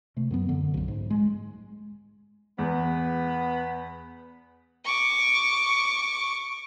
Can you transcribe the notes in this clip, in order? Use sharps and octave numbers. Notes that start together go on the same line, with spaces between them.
C3 A3
F#2 F#3 B3
F#2 D3
B1 F#2
G#2
G#3
E2 B3
C#6 D6